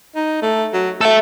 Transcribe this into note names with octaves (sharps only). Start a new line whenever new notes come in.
D#4
A3
F#3
A3 A4 E5